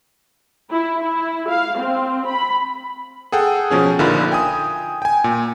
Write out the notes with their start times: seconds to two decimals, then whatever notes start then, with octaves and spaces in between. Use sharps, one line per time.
0.71 E4
1.03 E4
1.49 F5
1.80 C4
2.27 B5
3.32 G#4 A4 F#5 G5
3.70 B2 F3 C#4 G#4
3.99 A#1 D3 D#4 F4 A#4 B5
4.32 G5 G#5 D#6
5.02 G5 G#5
5.24 A#2